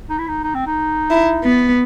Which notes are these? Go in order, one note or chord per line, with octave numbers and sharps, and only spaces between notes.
D#4
E4
D#4
D#4
C4
D#4
E4
B3